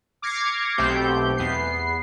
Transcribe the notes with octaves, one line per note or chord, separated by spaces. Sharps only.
D6 F6 G#6 A#6 C7 C#7
B1 B2 A3 C4 G4 G6
E2 B3 C7